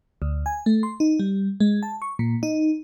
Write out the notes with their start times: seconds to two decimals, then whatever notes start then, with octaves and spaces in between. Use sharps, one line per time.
0.22 D2
0.46 G#5
0.66 A3
0.83 C6
1.00 D#4
1.19 G3
1.60 G#3
1.83 A5
2.02 C#6
2.19 A#2
2.43 D#4